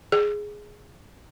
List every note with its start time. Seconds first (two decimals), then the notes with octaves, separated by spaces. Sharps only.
0.12 G#4